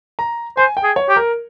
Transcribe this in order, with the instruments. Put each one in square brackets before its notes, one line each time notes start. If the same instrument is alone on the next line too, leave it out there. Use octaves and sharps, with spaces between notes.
[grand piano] A#5
[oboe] C5 [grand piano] G#5
[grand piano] G5
[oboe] G#4
[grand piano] C#5
[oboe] G4
[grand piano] A#4